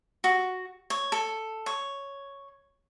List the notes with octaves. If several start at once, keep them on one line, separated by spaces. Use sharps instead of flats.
F#4
C#5
A4
C#5